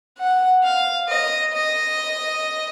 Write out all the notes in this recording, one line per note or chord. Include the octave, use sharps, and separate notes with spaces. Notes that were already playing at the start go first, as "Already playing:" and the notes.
F#5
F5
D#5
D#5